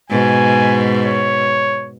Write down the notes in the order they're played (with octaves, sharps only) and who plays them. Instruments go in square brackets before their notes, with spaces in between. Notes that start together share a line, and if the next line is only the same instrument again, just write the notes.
[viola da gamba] G#2 B2 [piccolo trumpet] G#5
[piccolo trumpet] C#5